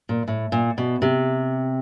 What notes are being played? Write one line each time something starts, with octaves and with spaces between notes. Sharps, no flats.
A#2
A2
A#2
B2
C3